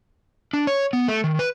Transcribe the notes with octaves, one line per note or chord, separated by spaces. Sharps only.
D4
C#5
B3
A3
D#3
B4